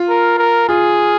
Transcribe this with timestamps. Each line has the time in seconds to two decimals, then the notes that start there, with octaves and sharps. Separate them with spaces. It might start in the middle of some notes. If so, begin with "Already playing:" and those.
Already playing: F4
0.09 A#4
0.39 A#4
0.69 F4 G#4